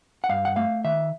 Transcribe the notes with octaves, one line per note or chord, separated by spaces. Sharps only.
F#5
G2 F5
F#5
A3 F5
D#3 E5